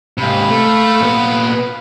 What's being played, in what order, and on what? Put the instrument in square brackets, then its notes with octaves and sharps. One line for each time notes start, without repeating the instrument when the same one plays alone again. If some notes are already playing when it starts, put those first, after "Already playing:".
[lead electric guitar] G#2 C3 [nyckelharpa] F5 B5
[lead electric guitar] A3
A#2 B3